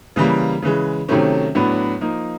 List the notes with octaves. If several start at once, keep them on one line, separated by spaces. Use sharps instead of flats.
C#3 E3 G3 A#3
C#3 E3 G#3
C3 D#3 F#3 A3 C#4
A2 F#3 B3 D4
F3 A#3 D#4